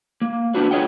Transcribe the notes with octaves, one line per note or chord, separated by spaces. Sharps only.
A#3
B3 D4 E4 F#4 C5
F4 G#4 C#5 D#5 F#5 G5